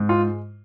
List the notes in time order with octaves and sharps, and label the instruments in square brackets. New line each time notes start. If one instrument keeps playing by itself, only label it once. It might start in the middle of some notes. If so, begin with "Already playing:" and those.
Already playing: [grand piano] G#2
G#3 F4